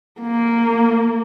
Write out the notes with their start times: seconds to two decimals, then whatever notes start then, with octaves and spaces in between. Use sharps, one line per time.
0.20 A#3